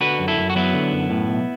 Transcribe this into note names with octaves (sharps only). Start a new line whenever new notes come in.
D3 F#4 B4
F#2
E4 A4
F#2
F#4
F#3 B3 E4
D3
F#2
A2
B1